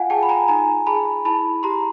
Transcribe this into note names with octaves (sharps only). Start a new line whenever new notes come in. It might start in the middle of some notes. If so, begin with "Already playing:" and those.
Already playing: F4 F5 F#5 G#5
G#4 G5 A5
B5
G#5 A#5
D#4 G#5 A#5
G#4 A5 B5
E4 A5 B5
G4 A#5 C6